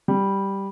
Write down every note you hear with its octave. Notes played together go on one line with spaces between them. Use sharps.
G3